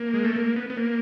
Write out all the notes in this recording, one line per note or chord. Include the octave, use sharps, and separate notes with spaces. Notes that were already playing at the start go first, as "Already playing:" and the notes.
Already playing: A#3
G#3
A3
A#3
B3
B3
A#3